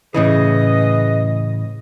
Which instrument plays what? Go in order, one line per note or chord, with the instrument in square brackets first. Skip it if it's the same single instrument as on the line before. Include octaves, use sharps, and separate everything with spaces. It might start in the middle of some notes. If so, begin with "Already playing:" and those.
[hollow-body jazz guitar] A2 C#3 E3 [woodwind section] G#4 B4 D#5